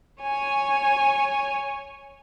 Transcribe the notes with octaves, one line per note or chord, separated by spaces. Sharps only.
C#5 G#5